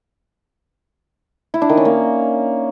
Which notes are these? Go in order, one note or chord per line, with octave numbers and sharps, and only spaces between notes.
E4
D4
D#3
C#4
A#3